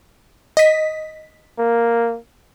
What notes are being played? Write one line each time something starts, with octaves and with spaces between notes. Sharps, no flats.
D#5 B6
A#3